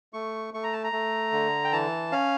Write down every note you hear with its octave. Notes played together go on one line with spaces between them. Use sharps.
A3 C#6
A3 C#6
A#5
A5
A#5
A3
D3
G5
E3 A5
C#4 F5